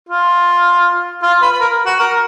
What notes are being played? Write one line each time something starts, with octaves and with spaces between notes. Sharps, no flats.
F4
F4
B4
B4
A#4
F#4
A#4